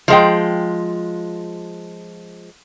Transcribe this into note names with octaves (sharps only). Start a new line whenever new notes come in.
F3 G#3 G5